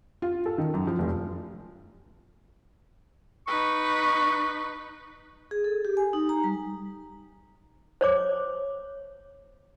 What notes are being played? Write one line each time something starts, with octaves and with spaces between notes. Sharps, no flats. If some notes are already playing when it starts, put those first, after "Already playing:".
F4
A4
D#3
F#2
F3
F1
D#4 B4 C#6
G#4
A4
G4
G#5
D#4
A#5
G3
C5 C#5 D6